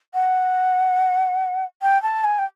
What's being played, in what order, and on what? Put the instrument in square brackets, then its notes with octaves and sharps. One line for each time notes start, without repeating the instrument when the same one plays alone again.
[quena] F#5
G5
A5
G#5
G5